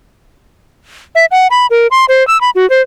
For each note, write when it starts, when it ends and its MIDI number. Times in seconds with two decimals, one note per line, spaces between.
1.15 1.25 76
1.31 1.47 78
1.51 1.67 83
1.70 1.87 70
1.91 2.05 84
2.09 2.26 72
2.28 2.40 88
2.41 2.50 83
2.55 2.68 66
2.70 2.82 72